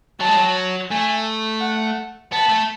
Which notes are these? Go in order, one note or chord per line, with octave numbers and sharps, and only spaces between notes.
F#3 A5
G#3
F#3
A3 G#5
F#5
B3 A5
A3